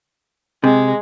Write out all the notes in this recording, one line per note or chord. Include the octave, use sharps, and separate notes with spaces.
C3 G#3